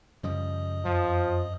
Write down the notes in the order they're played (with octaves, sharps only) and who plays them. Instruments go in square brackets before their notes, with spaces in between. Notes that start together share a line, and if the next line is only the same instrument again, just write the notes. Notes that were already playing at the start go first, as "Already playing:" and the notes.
[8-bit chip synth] F#2 D#5 D#6 [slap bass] C#3 F3 G3
[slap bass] F2 [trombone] F3